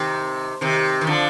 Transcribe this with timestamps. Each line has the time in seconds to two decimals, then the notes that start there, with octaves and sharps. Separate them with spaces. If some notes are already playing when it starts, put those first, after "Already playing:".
Already playing: C3 D#3
0.61 C3 D#3
1.01 D#3
1.07 D3 F3